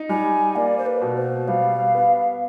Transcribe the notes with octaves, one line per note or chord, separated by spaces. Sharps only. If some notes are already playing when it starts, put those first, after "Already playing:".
Already playing: D#4
G3 G#5
A#3 D5
C5
B4
B2
C5
G3 F5
B3